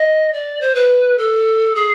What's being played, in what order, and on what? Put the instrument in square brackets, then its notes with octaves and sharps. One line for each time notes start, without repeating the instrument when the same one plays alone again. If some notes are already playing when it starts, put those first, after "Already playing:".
Already playing: [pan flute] D#5
D5
C5
B4
A4
G#4